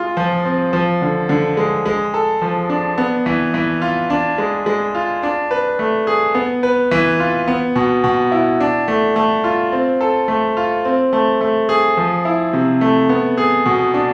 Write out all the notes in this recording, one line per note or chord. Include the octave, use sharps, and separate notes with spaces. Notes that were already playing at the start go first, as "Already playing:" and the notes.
Already playing: G#3 F4
F3
C4
F3
D3
D3
G#3
G#3
A4
F3
D4
B3
E3
E3
F4
D4
G#3
G#3
F4
D4
B4
A3
G#4
B3
B4
E3
F4
B3
B2
B2
E4
D4
A3
A3
F4
C4
A4
A3
F4
C4
A3
A3
G#4
F3
E4
C3
A3
B3
G#4
B2
D4